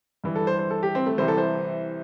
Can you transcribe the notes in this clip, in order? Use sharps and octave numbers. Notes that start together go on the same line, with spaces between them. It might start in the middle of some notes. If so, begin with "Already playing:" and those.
G2 E3
A4
C5
C5
A4
G4
C4
A3
C2 C3 E3 C5
A4
C5